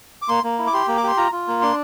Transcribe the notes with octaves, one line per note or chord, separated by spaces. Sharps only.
D6
A#3 C6
A#3
E4
D6
G4 C6
A#3
D6
G4 C6
F4 A#5
F4
A#3
D4 C6